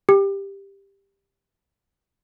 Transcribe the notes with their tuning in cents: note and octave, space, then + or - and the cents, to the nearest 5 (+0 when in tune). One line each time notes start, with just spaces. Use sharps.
G4 +10